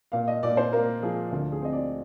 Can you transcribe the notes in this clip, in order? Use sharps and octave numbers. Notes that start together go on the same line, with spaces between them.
A#2 F5
D#5
A#2 D5
C5
A#3 A#4
F3 G#4
D2
G#4
C4 D#5
D5